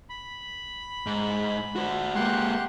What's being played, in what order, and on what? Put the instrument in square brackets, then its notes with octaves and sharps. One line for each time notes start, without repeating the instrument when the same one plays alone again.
[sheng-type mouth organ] B5
[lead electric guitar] G#2
F#4 C5
[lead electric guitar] G#3 A#3 [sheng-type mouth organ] G4 F#5 C6